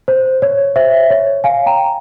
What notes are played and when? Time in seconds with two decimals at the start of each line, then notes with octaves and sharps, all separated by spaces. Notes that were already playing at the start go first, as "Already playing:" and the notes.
0.08 C5
0.42 C#5
0.76 C5 E5
1.10 C#5
1.44 F5 G#5
1.66 G5 A#5